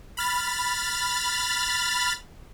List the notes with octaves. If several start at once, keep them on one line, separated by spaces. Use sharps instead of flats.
B5 F6 A6